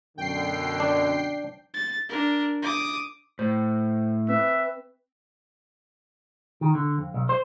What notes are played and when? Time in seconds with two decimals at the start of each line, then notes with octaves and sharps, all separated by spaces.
0.18 F#2 B2 D3 G5 C7
0.80 D4
1.74 A6
2.09 D4 A#4
2.62 D6 D#6
3.39 A2 C5
4.29 C4 B4 E5
6.61 D#3
6.75 D3
6.98 F2
7.14 B1
7.29 C5